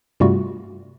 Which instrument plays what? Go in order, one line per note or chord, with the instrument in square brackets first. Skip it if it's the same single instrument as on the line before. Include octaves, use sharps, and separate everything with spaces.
[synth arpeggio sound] G2 C3 G3 A3 F4 F#4